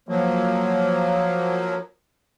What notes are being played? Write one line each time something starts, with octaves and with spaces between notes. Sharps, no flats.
F3 F#3 A#3